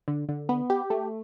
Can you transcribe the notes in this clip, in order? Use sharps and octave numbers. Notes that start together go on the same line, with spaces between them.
D3
D3
B3
G4
A3